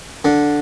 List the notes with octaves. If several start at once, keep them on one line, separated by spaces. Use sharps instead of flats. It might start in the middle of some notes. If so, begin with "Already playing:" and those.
D3